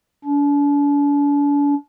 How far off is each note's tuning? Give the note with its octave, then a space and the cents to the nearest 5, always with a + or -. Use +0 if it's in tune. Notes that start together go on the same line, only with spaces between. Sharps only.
D4 -40